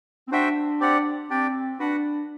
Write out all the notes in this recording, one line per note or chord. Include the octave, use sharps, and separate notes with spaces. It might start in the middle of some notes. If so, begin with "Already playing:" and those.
C4
D4 F#4 C5 E5 G5
C4 G4 D5 F#5
C4 D4 G4 D5 G5
D4 F#4 B4 F#5